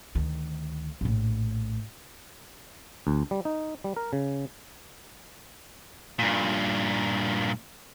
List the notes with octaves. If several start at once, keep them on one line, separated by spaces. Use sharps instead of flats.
D2 D#3
A#1 A2
D2
G3
D#4
G3
A#4
C#3
G2 A#2